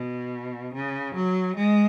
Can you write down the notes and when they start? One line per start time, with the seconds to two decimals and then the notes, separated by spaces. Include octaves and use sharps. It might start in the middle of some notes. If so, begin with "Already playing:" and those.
Already playing: B2
0.74 C#3
1.15 F#3
1.56 G#3